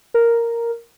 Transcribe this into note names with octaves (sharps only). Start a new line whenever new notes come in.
A#4